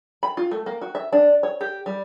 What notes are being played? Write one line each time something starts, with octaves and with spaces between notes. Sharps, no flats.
B5
F4
A3
A#3
F#4
E5
D4
C#5
G4
G3